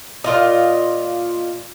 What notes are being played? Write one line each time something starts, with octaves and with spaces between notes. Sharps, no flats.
A#2 F4 D#5